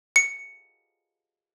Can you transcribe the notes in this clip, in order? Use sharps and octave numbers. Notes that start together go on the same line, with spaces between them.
C#7